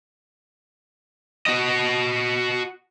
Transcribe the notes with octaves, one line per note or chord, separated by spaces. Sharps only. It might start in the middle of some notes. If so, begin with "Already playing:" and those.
F#4 D#5